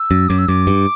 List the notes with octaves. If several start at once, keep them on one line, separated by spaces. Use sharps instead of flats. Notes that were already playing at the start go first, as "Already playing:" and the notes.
Already playing: E6
F#2
F#2 D6
E6
F#2 D6
G2